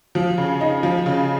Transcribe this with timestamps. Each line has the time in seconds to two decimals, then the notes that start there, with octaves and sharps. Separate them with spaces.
0.15 F3
0.38 C#3
0.61 D#4
0.83 F3
1.06 C#3